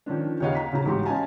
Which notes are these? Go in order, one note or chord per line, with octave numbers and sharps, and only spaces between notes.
D#3 F3 C#4 D4
D#2 C#3 C#5 D#5 F5 F#5
A#5 B6
C#3 F#3 C#4 A#5
A1 G#2 F#4 G4 C6
C#4 D#5 F5 G#5 A5